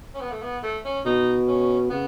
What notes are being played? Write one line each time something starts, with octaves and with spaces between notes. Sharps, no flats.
C#4
B3
A3
B3
A3
C#4
B2 D#4
C#4
C#3 B3